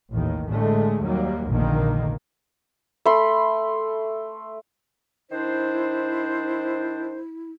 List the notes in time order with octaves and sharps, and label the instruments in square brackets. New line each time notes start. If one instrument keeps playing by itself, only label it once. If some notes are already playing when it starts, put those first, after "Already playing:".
[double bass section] A1 D#2 A2 D#3
A2 D3 G#3 A3
D#2 F#3 G3 A#3
F1 A#1 D3 D#3 A#3
[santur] A3 B5 C6
[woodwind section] D#3 D4 C5 [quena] E4